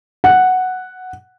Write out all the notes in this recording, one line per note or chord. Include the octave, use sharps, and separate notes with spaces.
F#5